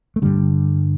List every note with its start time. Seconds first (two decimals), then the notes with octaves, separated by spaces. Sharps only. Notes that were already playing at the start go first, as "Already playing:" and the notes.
0.16 A3
0.22 G2 D3 G3